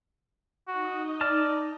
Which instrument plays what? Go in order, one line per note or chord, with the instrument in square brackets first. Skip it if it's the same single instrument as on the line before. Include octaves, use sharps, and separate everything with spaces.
[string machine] D#4 D#5 [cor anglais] F#4
[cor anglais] D5 [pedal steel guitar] A5 F6